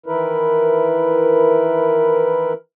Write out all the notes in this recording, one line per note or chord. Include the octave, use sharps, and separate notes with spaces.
D#3 E3 E4 A#4 B4